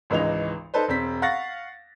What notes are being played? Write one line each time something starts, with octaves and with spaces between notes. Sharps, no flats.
G#1 C#2 E3 G#3 D#4 F7
D#4 A4 B4 C5
E1 C4 B6
F5 F#5 C#6 A6 A#6